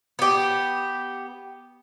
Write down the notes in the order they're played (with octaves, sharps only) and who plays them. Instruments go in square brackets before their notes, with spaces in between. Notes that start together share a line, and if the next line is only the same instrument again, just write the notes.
[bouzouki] B3 G4